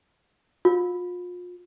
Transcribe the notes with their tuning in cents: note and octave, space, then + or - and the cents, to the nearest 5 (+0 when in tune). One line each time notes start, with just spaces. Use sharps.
F4 +35